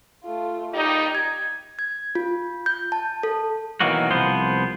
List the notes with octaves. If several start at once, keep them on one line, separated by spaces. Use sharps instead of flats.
A3 F4
A#2 G3 D#4 G4
G#6
G#6
F4
G6
A5
A4
B2 D#3 E3 F#3 A#3 F#4
C2 F3 B3 C5